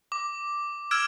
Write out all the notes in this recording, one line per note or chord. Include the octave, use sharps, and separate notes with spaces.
D6
D6 E6 F6 G#6 D7 E7